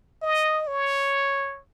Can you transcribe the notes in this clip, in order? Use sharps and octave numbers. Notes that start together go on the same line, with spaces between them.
D#5
C#5